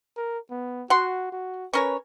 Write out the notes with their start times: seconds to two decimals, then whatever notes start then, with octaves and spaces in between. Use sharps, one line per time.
0.17 A#4
0.51 B3
0.90 F#4 F#5 C6
1.32 F#4
1.73 C#4 A#4 B4 C#5